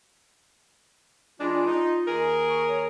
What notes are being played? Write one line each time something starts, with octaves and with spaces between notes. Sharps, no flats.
E3 G#3 D4 F4
D#4
D#2 G#4 A#4
C#6
C#5